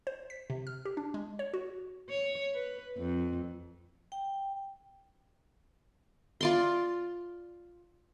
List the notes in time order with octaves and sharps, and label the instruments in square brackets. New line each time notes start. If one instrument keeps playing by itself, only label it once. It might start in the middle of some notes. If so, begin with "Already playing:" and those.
[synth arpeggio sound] C5
B6
C3
F6
G4
D4
G#3
C#5
F#4
[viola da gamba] C#5
B4
F2
[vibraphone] G5
[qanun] F4 D5 C6